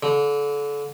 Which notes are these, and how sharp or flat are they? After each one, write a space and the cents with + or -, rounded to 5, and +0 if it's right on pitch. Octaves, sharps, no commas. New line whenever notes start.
D3 -30